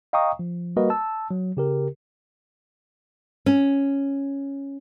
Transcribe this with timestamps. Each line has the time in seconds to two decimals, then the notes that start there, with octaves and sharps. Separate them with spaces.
0.13 D#5 F5 G5 A#5 C#6 D#6
0.39 F3
0.77 G3 A#3 F#4 A#4 B4 D#5
0.90 A5 E6
1.31 F#3
1.57 C#3 G4 A#4
3.46 C#4